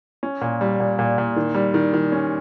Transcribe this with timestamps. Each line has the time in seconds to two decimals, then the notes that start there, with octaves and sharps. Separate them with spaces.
0.23 C#4
0.41 A#2
0.61 G3
0.80 A#2
0.99 A#2
1.18 A#2
1.36 D#3
1.54 G3
1.74 D#3
1.93 D#3
2.12 C#4